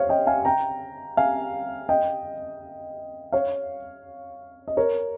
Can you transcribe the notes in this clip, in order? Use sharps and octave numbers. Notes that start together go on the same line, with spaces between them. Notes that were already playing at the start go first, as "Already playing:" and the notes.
Already playing: C5 C#5 F5
D#5 G5
F5 G#5
G5 A#5
F5 G#5
D#5 G5
C#5 F5
D#5
A#4 C#5